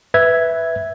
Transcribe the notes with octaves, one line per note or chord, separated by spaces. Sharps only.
B4 E5 G#6